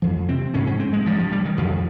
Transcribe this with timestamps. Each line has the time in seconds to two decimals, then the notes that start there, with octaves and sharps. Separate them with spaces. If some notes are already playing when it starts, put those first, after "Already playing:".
0.02 F2 F3
0.29 C3 C4
0.54 G#2 C#4
0.67 C#4
0.80 C4
0.93 G#3
1.06 G2 F3
1.19 F3
1.32 G3
1.45 D#3
1.58 F2 F3